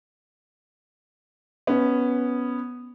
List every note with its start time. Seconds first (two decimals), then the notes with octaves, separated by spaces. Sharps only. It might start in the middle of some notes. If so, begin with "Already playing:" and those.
1.67 B3 C#4